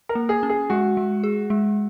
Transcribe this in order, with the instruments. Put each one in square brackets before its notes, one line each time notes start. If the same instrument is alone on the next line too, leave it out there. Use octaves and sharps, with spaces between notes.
[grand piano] A#4
[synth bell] A#3
[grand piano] G#4
[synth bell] C#4
[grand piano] G#4
[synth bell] G#3 [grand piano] F#4
[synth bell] G#3
G#4
G#3